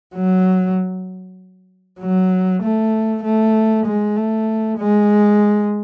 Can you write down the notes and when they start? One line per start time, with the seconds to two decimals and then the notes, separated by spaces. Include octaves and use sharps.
0.16 F#3
2.00 F#3
2.63 A3
3.24 A3
3.86 G#3
4.16 A3
4.79 G#3